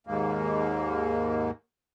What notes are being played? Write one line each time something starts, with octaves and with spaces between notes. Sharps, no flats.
D#2 G#2 A#3